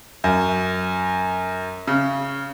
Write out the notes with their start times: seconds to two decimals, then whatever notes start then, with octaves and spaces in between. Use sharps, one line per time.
0.24 F#2
1.87 C#3